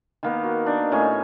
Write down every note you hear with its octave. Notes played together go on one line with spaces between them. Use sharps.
D#3 A#3 B3
F#4
D4 D#4
A2 C#4 D#4 G#5